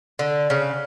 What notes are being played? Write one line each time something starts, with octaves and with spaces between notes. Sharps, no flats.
D3
C#3